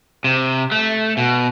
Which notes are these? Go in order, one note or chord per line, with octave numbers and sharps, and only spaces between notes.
C3
A3
B2